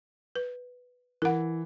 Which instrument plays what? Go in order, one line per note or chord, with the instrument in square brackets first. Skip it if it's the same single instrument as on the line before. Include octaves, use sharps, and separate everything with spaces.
[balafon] B4
[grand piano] E3 [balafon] A#4 F#5